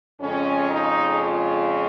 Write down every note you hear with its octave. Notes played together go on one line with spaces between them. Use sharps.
F2 C#3 G#3 C#4
D#4
F4